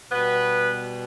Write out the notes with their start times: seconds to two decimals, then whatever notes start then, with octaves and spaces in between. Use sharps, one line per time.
0.11 B2 G3 B3 B4